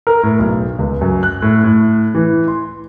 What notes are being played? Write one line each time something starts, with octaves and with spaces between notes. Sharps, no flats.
A#4
A2
B1
C#2
F#2
F#6
A2
A2
E3
C6